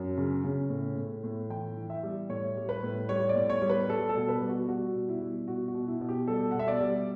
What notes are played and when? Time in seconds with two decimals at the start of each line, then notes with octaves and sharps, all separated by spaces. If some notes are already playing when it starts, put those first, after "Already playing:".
Already playing: F#2
0.17 C#3
0.44 C#3
0.70 A2
0.96 A2
1.24 A2
1.50 E3 G5
1.77 E3
1.90 E5
2.03 G3
2.29 A2 C#5
2.57 G3
2.69 B4
2.83 A2
3.09 G3 C#5
3.29 D5
3.35 A2
3.50 C#5
3.62 G3
3.69 B4
3.89 G3 A4
4.09 A4
4.15 B2
4.29 B4
4.41 G3
4.49 F#4
4.68 G3 F#4
4.95 B2
5.09 E4
5.22 G3
5.48 B2 F#4
5.68 F#4
5.74 B2
5.88 E4
6.01 B2
6.09 G4
6.28 G3 A4
6.51 B2 F#5
6.59 E5
6.68 D5
6.81 G3